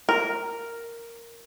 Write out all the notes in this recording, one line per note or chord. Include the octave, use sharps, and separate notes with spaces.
A#4